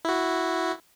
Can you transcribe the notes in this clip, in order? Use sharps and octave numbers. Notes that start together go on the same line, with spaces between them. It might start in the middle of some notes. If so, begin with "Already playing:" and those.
E4 F#4